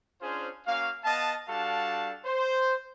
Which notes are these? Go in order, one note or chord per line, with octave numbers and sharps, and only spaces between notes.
C#4 D4 F4 G#4 C5
A#3 C#4 F#4 F5
B3 D#5 F5 A5
G3 D4 F#4 A4 F5 A5
C5